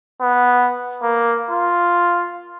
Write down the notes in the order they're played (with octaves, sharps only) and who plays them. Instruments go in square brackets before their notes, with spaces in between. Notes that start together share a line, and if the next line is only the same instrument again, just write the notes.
[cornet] B3
A#3
F4